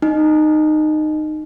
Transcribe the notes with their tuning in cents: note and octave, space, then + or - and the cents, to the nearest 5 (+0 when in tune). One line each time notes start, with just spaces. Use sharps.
D#4 -20